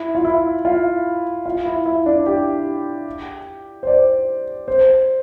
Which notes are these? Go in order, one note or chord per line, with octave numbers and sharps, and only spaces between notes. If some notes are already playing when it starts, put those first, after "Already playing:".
Already playing: E4
F4
E4
F4
F4
E4
E4
D4
G4
C5
D5
C5